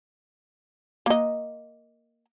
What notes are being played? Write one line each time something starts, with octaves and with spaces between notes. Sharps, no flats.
A#3 D#5